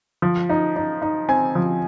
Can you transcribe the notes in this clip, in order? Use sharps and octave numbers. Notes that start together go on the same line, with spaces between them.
F3
D#4
D#4
D#4
C4 G#5
F3